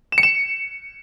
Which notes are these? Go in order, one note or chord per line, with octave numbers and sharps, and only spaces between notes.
E7
C#7
E7